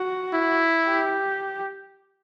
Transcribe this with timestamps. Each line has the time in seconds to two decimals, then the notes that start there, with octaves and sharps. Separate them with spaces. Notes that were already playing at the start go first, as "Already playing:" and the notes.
Already playing: F#4
0.33 E4
0.87 G4